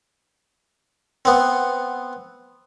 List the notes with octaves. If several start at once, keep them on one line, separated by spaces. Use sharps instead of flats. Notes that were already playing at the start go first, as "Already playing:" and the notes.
B3 C4